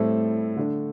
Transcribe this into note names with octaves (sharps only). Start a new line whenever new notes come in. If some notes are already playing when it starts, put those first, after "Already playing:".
Already playing: A2 G3 C4 E4 A4
D3 A3 D4